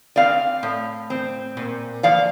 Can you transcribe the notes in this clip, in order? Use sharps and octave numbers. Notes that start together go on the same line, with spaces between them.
C4 D5 F5
A2
C4
A#2
F3 D5 F5